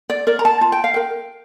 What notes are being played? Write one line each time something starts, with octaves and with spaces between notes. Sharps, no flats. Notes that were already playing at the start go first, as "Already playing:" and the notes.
D5
A#4 D5
A#5
A5
F4 A5
G5
F5
A#4 G5